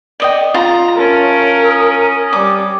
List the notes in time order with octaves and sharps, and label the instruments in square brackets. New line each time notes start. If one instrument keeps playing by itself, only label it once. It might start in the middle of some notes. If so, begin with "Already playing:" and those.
[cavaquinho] D5 D#5 G5
[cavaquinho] F4 [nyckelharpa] A#5
[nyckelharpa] C#4 [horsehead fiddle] A#4 [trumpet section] C#5 E5 A5
[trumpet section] A#5 D#6
[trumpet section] G3 D5 [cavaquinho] D6